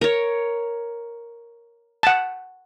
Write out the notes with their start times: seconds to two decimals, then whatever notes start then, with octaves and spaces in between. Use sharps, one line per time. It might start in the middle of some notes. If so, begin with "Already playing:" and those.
0.01 A#4 C#5
2.03 F#5 A5